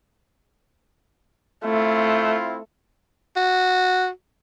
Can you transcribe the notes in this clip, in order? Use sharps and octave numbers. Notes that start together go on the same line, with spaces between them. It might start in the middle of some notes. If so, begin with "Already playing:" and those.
A3 C4 E4 F4
F#4